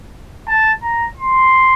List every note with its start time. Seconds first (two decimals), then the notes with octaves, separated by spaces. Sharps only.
0.48 A5
0.83 A#5
1.17 C6